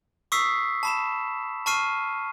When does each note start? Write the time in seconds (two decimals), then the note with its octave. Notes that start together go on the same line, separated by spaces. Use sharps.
0.32 C#6 D#6 E6 B6 C7
0.83 A5 B5 E7
1.66 A5 C#6 F6 C7 D#7